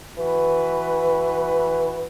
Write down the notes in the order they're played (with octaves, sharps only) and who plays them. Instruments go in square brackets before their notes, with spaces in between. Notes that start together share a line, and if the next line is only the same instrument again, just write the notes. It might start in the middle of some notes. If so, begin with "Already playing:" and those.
[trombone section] E3 F#4 B4